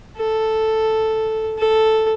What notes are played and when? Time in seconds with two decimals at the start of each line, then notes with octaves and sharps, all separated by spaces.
0.17 A4
1.59 A4